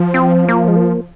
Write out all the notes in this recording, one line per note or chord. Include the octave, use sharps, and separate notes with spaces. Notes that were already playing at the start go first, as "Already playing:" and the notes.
Already playing: F3
C4
A#3
G#3
A#3